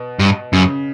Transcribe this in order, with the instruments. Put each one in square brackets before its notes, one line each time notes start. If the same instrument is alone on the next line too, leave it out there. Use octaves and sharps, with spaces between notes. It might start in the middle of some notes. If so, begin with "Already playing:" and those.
Already playing: [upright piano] B2
[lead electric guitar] G2
[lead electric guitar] F#2 [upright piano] C#3